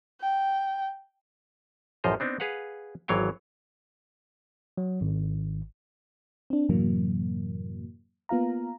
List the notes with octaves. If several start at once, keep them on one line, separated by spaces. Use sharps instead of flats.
G5
A1 F#2 F3 C5 D#5 A#5
B3 C4 D4 D#4
G#4 B4 F5 F#5
G#1 E3 F#3 C#5 F5 G5
F#3
G#1
C4 D4
F#2 A2 C3 E3 F#3 A#3
A#3 B3 F4 F5 A#5